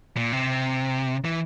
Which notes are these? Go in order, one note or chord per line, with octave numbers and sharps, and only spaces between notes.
A#2
C3
E3